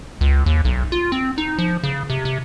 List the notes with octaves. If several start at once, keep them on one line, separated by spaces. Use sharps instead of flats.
C#2
D#2
B1
F4
C4
D#4
F3
C#3
C3
C3